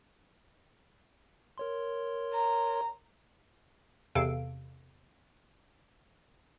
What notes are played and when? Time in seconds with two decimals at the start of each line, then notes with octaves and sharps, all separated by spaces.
1.58 A#4 C#5 C6
2.33 A#5
4.15 E2 C3 A4 F5 D7